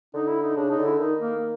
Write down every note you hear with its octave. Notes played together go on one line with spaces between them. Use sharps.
D3 D#4
E4
D#4
C#3 D4
D#4
D3
E4
D#3 D#4
A#3